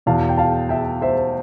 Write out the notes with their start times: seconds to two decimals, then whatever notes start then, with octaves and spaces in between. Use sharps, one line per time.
0.06 E2 B2 F5 A5
0.29 G5
0.38 F5 A5
0.69 E5 G5
1.02 C5 E5